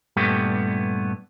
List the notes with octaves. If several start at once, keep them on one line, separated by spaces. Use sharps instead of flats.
G2 A#2 G3 A3 B3